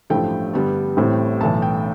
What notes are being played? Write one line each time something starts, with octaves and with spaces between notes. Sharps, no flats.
A1 G2 F3 A3 E4 G5
G2 D3 G3 B3 D4
A1 A2 G3 C4
B1 A2 E3 A5
G5